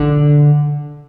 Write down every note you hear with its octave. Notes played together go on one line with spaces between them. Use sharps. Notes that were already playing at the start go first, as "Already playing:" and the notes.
Already playing: D3